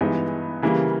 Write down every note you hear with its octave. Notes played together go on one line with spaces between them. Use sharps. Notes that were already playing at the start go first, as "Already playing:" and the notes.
G2 E3 G#3 B3 D#4
C#3 E3 G3 A#3